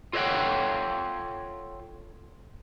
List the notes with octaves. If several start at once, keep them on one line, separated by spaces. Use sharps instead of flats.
F4 A4 C#5 D#5 F#5 G5